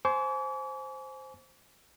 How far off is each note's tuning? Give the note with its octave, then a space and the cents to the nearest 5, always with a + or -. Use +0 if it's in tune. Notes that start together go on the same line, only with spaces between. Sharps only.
C5 +0 G#5 +25 D6 -45